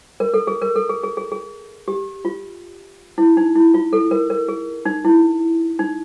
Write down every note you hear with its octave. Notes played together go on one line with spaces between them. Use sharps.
A#4
A4
G#4
A#4
A4
G#4
G#4
G#4
G#4
G4
F4
E4
D#4
E4
F4
A4
A#4
A#4
G#4
D#4
E4
D#4